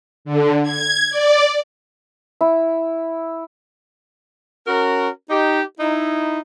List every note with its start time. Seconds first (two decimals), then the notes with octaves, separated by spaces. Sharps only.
0.25 D3
0.63 G#6
1.10 D5
2.41 E4
4.67 C#4 F#4 A#4
5.29 D#4 G4
5.79 D#4 E4